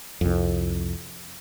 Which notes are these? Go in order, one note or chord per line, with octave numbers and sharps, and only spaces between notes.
C2 F2